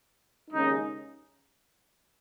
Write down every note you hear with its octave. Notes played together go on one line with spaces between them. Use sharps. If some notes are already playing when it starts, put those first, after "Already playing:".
D#2 C#3 G#3 C#4 D#4